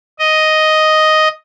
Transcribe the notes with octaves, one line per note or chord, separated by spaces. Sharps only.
D#5